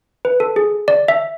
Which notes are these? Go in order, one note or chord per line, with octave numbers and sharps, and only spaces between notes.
B4
A4
G#4
D5
E5